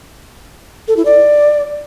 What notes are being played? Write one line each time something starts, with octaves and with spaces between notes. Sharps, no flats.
A4
E4
D5